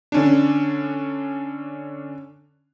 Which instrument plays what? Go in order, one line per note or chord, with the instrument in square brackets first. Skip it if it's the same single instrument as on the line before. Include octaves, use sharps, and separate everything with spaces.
[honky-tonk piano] D3 C#4 D4